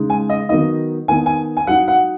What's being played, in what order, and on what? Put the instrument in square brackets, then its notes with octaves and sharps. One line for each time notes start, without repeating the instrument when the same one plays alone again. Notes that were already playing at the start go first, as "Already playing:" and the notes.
Already playing: [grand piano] C#3 G#3 D#4
G#5
D#5
D#3 F#3 B3 D#4 D#5
D#3 B3 D#4 G#5
G#5
G#5
F#3 D#4 F#5
F#5